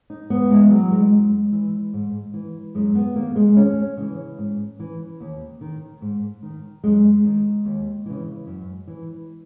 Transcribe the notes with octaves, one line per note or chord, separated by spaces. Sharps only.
D#4
G#2 B3
G#3
E3 F#3
G#3
F#2
E3
G#2
E3
F#2 G#3
B3
D#3 A#3
G#3
D#2 C#4
C#3 E3
G#2
E3
D#2
D#3
G#2
D#3
F#2 G#3
D#3
D#2
C#3 E3
F#2
E3